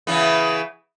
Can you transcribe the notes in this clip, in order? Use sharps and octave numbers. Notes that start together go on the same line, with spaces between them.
C#3 E3 B3